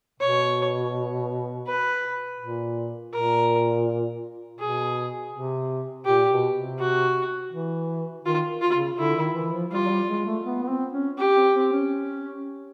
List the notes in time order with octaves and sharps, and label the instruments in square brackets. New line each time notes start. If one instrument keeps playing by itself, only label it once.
[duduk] B2 [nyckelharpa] C#5
[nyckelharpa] B4
[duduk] A#2
[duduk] A#2 [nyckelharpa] A#4
[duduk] B2 [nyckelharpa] G#4
[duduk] C3
[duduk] A#2 [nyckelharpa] G4
[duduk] B2
C3
[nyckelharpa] F#4
[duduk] E3
[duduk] D#3 [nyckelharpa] F4
[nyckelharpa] F4
[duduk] C#3
[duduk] D3 [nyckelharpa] E4
[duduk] D#3
E3
F3
[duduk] G3 [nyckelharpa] F4
[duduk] F#3
G3
G#3
A3
B3
B3
C4
C#4
[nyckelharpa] G4
[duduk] C4
C4
C#4